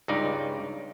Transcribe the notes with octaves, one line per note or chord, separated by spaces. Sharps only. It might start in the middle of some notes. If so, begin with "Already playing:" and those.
C#2 G2 C#3 D#4 D5